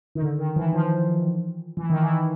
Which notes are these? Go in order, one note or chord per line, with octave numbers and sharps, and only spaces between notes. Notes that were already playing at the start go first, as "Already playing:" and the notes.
D#3
D3
D#3
E3
F3
E3
D#3
E3